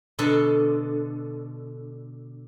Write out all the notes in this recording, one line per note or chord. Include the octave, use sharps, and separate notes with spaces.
B2 D3 A4